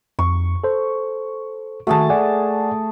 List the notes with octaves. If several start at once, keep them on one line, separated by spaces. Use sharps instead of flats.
F2 C#6
A4 C5
D#3 A3 F#4 G#4 A5
D5 F#5 G#5